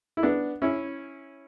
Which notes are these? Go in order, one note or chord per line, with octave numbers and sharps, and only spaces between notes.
E4
B3 D4
C#4 E4